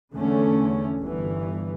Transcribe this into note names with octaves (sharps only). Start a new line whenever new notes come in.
E2 D3 A3 C#4
G1 G2 E3